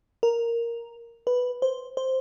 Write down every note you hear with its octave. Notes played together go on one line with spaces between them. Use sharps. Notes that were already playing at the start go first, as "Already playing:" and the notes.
A#4
B4
C5
C5